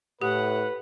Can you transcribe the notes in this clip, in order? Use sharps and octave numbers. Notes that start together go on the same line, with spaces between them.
A2 G4 B4 F#5